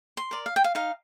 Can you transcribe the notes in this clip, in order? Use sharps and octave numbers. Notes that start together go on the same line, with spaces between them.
C6
A#4 D5
F5
G5
F5
D#4 F5